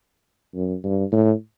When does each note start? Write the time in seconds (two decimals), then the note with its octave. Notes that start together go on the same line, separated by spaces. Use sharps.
0.55 F#2
0.84 G2
1.12 A2